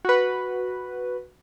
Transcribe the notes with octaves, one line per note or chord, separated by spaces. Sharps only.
F#4 B4